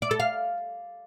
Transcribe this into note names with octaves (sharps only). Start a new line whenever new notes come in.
D5
A4
F5